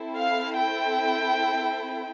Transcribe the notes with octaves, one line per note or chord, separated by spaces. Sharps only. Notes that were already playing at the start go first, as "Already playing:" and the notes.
Already playing: C4 E4 A4
F5
G5